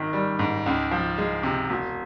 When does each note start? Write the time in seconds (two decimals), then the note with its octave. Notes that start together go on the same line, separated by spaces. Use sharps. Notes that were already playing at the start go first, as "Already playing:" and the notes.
Already playing: G#1 D#3
0.13 G3
0.39 G#2
0.66 C#2
0.91 F3
1.18 G#3
1.43 C3
1.69 E1